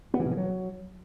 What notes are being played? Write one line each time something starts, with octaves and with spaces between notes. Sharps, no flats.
B3
E3
B2
E3
F#3